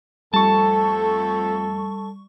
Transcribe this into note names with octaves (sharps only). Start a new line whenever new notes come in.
F2 G3 A3 A4 A5 C#6